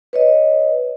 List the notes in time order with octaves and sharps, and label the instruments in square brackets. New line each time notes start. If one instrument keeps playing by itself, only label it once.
[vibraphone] B4 C#5 D#5